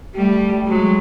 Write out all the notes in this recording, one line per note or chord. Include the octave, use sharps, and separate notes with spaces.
G3 A3
F#3 G#3